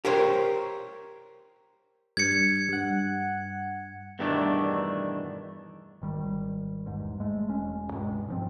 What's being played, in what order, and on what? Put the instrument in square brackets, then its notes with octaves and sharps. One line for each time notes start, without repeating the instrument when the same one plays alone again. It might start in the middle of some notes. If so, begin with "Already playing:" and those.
[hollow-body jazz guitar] G4 A#4 C5 C#5
[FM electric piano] G2 [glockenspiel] G#6 C#7
[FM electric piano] G2 F#5
[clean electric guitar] E2 G2 B2 D#3 A3 D4
[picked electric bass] G#1 D#3 G3
A1 E2 G#2
G#3 A3
E1 G#3 C#4
C#2 G2 B2 G#3
G#2 F3 C4